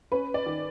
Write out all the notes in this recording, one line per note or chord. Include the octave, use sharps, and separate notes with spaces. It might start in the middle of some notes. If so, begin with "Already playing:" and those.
C#4 B4
D5
D#3